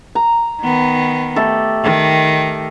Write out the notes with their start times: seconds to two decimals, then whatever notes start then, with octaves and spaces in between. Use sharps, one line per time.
0.15 A#5
0.61 D#3 B3
1.36 A3 G4 A4
1.83 D#3